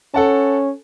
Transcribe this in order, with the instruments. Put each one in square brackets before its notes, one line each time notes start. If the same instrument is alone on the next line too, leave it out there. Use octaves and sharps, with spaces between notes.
[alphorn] C#4 [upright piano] A4 F#5 A5